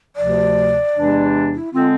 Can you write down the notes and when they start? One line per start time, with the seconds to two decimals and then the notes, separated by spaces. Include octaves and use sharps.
0.16 D2 C3 F3 D5
0.95 E2 C3 E3 G#3 D4
1.55 E4
1.73 D3 G#3 C4 F4